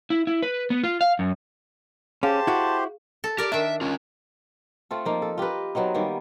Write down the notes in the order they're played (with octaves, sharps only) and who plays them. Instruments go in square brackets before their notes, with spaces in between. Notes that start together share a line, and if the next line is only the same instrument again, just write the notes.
[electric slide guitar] E4
E4
B4
B3
F4
F5
F#2
[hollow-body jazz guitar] C#4 [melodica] G4 C5 C6 [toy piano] G#4 F5 [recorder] A5
[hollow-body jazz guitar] E4 F#4
[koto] A4
[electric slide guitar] G4 [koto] A#4 D5
[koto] D#3 D4 [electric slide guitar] E5
[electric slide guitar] C#4 F4
[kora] A3 C4 F4 A4
F3 A#3 D#4
A4
F4 G4 A#4 B4
F#3 B3 C4 D#4
D#3 G3 A#3 B3